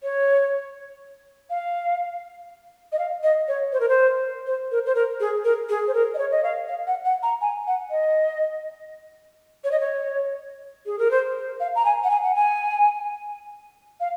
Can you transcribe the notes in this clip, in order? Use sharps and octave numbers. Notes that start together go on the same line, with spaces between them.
C#5
F5
D#5
F5
D#5
C#5
C5
A#4
C5
C5
A#4
C5
A#4
G#4
A#4
G#4
C5
A#4
D#5
C#5
D#5
F5
F5
F#5
F#5
A#5
G#5
F#5
D#5
C#5
D#5
C#5
G#4
A#4
C5
F5
A#5
G#5
F#5
G#5
F#5
G#5
F5